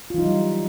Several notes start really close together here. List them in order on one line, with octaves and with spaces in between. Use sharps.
F4 E3 D#4 F#3 G3